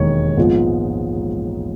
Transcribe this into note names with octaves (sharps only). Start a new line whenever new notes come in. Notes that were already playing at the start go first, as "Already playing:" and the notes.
Already playing: E1 D#2 D#3 G#3 C#5
A#1 G#2 F3 G#3 B3